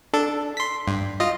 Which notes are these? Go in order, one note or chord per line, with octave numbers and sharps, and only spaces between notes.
D4 A4
C6 B6
G2
F4 D#5